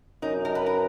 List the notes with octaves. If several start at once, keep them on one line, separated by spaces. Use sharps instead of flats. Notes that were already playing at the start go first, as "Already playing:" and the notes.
F#2 D#4
A#4
B4
A#4